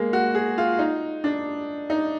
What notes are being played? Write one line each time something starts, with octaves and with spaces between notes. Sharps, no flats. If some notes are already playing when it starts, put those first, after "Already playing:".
Already playing: G#3 A#3
F#4
G#4
F4
D#4
D4
D#4